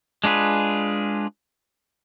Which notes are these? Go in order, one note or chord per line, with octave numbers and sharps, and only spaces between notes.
G#3 D4 F4 G#4 B4